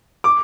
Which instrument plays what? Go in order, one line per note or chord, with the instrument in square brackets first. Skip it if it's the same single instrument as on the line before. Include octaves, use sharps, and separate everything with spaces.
[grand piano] D6